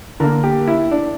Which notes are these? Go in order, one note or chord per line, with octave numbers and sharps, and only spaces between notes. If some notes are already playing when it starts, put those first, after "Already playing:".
D3 A#3 A#4
G4
E4
D4